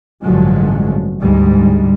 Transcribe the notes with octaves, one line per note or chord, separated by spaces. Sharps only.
A1 G2 D3 F3 F#3 G#3
D2 G#2 G3 G#3